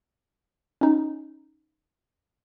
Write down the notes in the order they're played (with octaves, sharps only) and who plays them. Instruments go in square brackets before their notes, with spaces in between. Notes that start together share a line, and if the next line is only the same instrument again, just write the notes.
[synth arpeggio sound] C#4 D#4